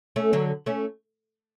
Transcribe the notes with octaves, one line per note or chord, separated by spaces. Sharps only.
A3 C#4
D3 F#3
A3 C#4